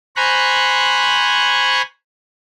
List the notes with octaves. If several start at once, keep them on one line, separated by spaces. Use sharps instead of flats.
C5 G#5 A#5 B5 C#6 F#6